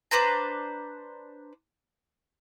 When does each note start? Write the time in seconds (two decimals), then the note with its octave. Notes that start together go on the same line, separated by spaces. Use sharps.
0.11 D4 B4 C5 A#5